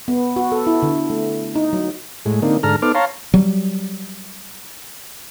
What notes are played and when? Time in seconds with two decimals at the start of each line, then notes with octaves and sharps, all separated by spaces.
0.08 B3
0.36 F#4
0.52 A4
0.67 E4
0.83 D3
1.10 A3
1.55 D#4
1.73 F#3
2.26 A2 G#3
2.42 D3 A#3 C4 D#4
2.63 G#2 D3 A4 A#5 F6
2.82 B3 D#4 A4 C5 D6 F6
2.95 C#5 F5 A5 A#5 C6
3.34 F#3 G3